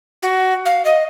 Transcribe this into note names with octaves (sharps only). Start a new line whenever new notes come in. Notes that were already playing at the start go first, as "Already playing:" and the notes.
F#4
F5
D#5